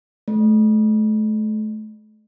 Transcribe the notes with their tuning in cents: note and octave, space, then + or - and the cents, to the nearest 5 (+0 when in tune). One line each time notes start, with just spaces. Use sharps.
A3 -35